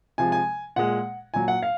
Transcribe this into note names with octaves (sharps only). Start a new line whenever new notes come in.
C3 F3 G#3 G#5
G#5
A#2 G#3 F#5
A#2 F#3 G#5
F#5
F5